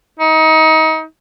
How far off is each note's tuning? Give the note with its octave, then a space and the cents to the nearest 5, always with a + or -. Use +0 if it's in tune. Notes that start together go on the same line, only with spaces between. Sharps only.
D#4 +30